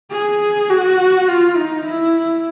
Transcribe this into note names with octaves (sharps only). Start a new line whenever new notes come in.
G#4
F#4
F4
D#4
E4